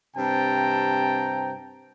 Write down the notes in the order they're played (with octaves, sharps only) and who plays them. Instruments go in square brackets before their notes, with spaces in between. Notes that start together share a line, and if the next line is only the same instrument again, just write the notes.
[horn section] G2 C3 C4 G5 A5 A#5